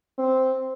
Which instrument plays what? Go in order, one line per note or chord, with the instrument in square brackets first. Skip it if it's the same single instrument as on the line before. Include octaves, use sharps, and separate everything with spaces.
[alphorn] C4